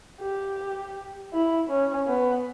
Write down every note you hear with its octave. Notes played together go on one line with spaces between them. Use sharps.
G4
E4
C#4
B3